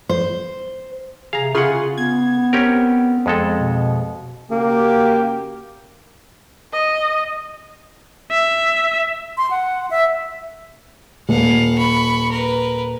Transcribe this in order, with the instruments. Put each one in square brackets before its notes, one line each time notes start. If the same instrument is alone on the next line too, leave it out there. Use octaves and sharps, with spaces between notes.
[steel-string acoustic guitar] C5
[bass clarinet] C3 [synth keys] G#4 [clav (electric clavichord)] F5 A#5
[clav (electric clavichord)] C#3 F#5 [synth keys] F4 G#4 C6
[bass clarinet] B3 [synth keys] G#6
[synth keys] C4 [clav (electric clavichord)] C#4 G4 A#4
[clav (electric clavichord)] F2 G#3 A4
[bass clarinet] B2
[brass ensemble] C#3 F#4 G4 [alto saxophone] A#3
[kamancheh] D#5
[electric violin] E5
[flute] C6
F#5
E5
[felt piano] D#1 [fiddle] F5 F#5
[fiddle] B5 C#6
A#4 B4